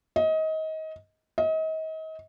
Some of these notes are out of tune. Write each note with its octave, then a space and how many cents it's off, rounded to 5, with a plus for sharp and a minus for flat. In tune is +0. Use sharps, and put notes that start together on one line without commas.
D#5 +25
D#5 +35